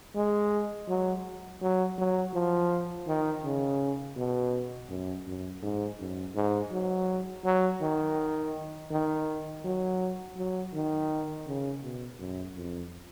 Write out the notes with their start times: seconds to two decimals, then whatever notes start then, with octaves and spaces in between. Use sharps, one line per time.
0.15 G#3
0.88 F#3
1.61 F#3
1.98 F#3
2.33 F3
3.07 D#3
3.44 C#3
4.17 B2
4.89 F#2
5.26 F#2
5.62 G#2
6.00 F#2
6.35 G#2
6.71 F#3
7.44 F#3
7.81 D#3
8.91 D#3
9.64 F#3
10.38 F#3
10.73 D#3
11.47 C#3
11.83 B2
12.19 F#2
12.56 F2